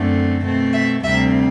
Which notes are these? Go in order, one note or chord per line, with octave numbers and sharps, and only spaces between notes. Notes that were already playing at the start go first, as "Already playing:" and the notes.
Already playing: F#2 D3 A3 C4
B2 A3 C4
E5
D2 C3 G3 C4 E5